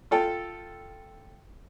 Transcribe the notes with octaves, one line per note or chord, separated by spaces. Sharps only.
F4 A4 G5